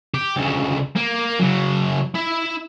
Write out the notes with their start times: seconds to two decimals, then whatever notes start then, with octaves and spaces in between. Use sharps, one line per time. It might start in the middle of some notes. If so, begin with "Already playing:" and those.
0.14 G4
0.37 D2 C#3
0.95 A#3
1.39 C#3 F#3
2.14 E4 E5